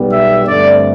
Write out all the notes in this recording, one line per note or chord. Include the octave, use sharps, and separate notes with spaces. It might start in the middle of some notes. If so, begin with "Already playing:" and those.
Already playing: B1 B2 G3 B3
E5
G2 D3 A3 C4 D5